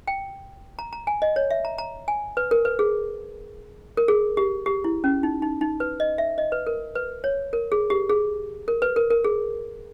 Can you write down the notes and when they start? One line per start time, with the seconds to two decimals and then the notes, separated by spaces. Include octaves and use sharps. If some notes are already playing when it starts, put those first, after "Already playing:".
0.07 G5
0.79 A#5
0.93 A#5
1.07 G#5
1.22 D#5
1.36 C#5
1.51 E5
1.65 A#5
1.78 A#5
2.08 G#5
2.37 B4
2.51 A#4
2.65 B4
2.79 G#4
3.97 A#4
4.08 G#4
4.37 G4
4.66 G4
4.84 E4
5.04 C#4
5.23 D#4
5.42 D#4
5.61 D#4
5.80 B4
6.00 D#5
6.18 E5
6.38 D#5
6.52 B4
6.67 A#4
6.95 B4
7.24 C#5
7.53 A#4
7.72 G#4
7.90 G4
8.10 G#4
8.68 A#4
8.82 B4
8.96 A#4
9.11 A#4
9.24 G#4